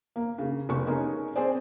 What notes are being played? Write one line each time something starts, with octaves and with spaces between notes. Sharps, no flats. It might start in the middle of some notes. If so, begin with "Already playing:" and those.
A#3
C#3
F1 C#6
C#4 D#4 G#4 A#4
C4 G#4 C5 D5